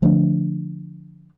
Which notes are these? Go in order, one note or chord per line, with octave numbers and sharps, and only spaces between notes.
D3 F3 A3 D4